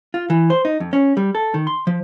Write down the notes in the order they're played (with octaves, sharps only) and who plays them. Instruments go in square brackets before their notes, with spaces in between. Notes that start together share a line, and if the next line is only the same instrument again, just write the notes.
[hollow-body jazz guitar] F4
E3
C5
D#4
F2
C#4
G3
A4
D#3
C6
F3